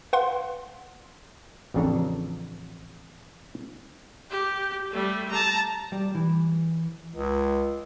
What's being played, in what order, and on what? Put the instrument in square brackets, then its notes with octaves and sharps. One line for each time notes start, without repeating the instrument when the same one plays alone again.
[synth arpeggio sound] B4 F5 F#5 C6
[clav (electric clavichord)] A1 F2 C#3 D4 A4 A#5
[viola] G4
G3 A3
A5 A#5
[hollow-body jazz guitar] G3
E3
[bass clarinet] C#2